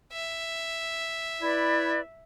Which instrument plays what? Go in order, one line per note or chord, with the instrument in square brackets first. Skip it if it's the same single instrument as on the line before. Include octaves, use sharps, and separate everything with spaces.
[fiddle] E5
[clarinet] E4 [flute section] B4 D5 B5